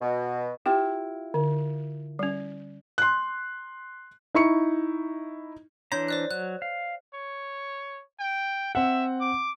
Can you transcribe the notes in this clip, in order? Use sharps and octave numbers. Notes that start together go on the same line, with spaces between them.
B2
E4 F4 G4 G5
D3
G3 C#4
C6 F#6
D#4 E4 C#6 C#7
E3 D4 C#5 A#5 C6 G6
C5 D5 F#6
F#3 F#6
F5
C#5
G5
C4 E5 F#5
D6